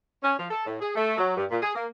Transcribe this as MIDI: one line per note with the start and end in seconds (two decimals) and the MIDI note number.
0.23 0.34 61
0.38 0.46 53
0.51 0.63 69
0.67 0.76 45
0.80 0.92 68
0.95 1.15 57
1.18 1.35 54
1.37 1.45 43
1.50 1.58 46
1.62 1.71 68
1.75 1.86 58